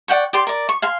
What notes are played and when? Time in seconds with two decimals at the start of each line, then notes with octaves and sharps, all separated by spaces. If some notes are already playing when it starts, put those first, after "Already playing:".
0.08 D5 F#5 G5 C#6
0.33 G4 D5 C6
0.47 A#4 D5
0.69 C#6
0.82 F5 G#5 C6